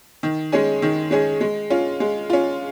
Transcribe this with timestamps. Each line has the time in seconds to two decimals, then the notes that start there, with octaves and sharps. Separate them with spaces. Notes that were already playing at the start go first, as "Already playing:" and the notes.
0.23 D#3
0.52 G#3 C#4 G#4
0.82 D#3
1.11 G#3 C#4 G#4
1.41 G#3
1.70 C#4 F4
2.00 G#3
2.30 C#4 F4